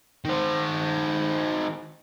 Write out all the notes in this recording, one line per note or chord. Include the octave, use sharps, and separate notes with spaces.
D#3 C5